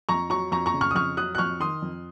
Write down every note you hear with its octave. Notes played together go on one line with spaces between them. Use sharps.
F2 A#5 C#6
F#3 A#5 C#6
F2 A#5 C#6
A#5 C#6
C#3
C#6 F6
D#6
F2 C#6 F6
F#3 D#6 F#6
F#6
F2 C#6 F6
D#3 C6 D#6
F2